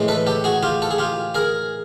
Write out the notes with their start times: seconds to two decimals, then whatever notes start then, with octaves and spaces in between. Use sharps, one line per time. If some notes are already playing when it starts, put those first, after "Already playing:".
Already playing: A2 E3 G#3
0.08 A4 B4
0.27 G4 A4
0.44 F#4 G#4
0.63 F4 G4
0.82 A4
0.91 G#4
0.98 F4 G4
1.35 G#4 A#4